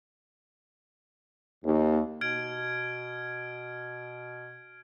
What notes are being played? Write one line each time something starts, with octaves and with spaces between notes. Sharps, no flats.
D#2
B2 F6 G#6 D7